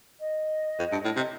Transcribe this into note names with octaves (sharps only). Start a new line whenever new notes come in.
D#5
F2
G2
A2
C3